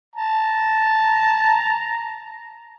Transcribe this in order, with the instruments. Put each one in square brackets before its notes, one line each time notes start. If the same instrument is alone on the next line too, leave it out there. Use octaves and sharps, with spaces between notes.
[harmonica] A5 A#5